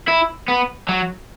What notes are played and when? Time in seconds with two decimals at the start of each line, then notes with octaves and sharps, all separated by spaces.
0.08 E4
0.48 B3
0.89 F#3